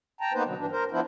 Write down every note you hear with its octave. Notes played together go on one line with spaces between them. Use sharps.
G5 A5 A#5
A#3 B3 D#4 B4 C5
B2 D3 F#3
G2 E3 D4
A#4 C5
F3 B3 D4 E4 C5